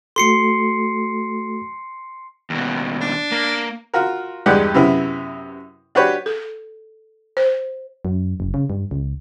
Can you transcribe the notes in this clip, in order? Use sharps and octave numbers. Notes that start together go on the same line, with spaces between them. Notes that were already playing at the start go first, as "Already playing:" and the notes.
A3 F#4 A4 C6 C7 C#7
D#2 B2
D4
A#3
F4 F#4 A#4
E2 G2 G#3 G4 D5 F#5
F#2 C3 B3 E4
D4 F#4 G4 B4 C#5
A4
C5
F#2
F#1
C#3
G2
C#2